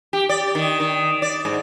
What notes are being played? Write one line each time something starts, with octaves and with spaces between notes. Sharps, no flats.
G4
D5
D#3
D#3
D5
G#2